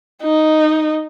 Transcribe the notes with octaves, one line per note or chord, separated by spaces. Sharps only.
D#4